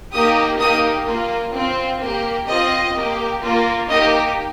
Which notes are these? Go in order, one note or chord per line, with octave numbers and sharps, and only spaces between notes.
A#3 D#4 G4 D#6
A#3 D#4 G4 D#6
A#3 F4
C4 F4
A#3 G4
C4 F4 D#5
A#3 G4
A#3 F4
A#3 D#4 G4 D#5